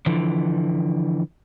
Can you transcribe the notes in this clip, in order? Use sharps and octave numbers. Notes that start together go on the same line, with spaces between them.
D3 E3 F3